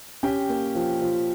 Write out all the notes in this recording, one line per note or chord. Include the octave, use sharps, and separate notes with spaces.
C#4 G4 G5
A#3
F3
F3